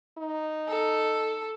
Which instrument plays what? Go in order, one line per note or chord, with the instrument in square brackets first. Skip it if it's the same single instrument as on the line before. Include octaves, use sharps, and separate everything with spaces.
[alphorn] D#4
[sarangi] A4